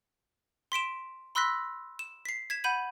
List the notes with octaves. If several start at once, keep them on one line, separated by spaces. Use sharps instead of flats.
C6 B6 D7 E7
B5 C6 E6 F#6 A#6 B6
E7
B6 C7
G#6 B6 E7
F#5 B5 G6 D#7 F#7